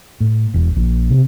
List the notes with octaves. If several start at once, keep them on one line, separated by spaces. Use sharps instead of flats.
A2
E1
A#1
C3